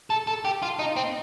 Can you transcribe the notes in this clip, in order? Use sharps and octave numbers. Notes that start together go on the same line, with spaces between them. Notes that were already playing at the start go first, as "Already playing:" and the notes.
A4
A4
G4
F4
D#4
C4